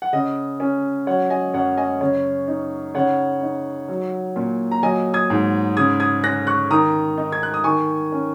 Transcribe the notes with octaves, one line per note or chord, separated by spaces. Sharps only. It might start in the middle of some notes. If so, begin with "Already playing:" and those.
F#5
C#3 D#5
C#4
F#3 C#5 F#5
D#5 G#5
F#2 C#5 F#5
D#5 G#5
C#3 C#5
D#4
C#3 C#5 F#5
D#4
F#3
A#2
A#5
F#3 D#5 G#5
D#6 G#6
G#2
C#3 D#6 G#6
D#6 G#6
C#4 F#6 A#6
C#6 F#6
D#3 A#5 D#6
D#4
G#6
F#6
D#6
D#3 G#5 C#6
C#4